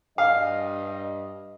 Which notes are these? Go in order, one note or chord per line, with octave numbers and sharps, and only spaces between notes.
G2 D#5 F5